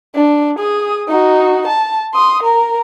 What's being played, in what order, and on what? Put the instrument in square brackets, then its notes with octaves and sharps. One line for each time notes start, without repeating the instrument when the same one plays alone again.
[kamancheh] D4
G#4 D#6
D#4 F#4
A5
C6 D#6
A#4 A#5